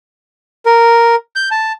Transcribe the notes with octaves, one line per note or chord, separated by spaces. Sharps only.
A#4
G6
A5